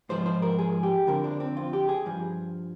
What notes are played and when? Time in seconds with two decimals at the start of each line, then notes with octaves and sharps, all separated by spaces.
0.09 G#2 F3 C5
0.26 C5
0.42 A#4
0.59 G#4
0.83 G4
1.07 F2 D3 F3 A#4
1.24 D4
1.40 C4
1.57 F4
1.73 G4
1.89 G#4
2.06 G2 F3